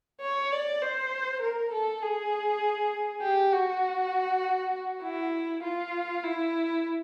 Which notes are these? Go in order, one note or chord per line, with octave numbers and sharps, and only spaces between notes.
C#5
D5
C5
A#4
A4
G#4
G4
F#4
E4
F4
E4